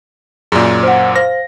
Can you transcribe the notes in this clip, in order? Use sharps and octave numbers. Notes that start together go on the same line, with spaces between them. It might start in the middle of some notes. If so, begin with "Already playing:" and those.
F#2 A#2 G#4 D5
C5 F#5
C5 F5 A#6